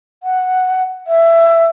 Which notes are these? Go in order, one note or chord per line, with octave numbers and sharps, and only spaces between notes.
F#5
E5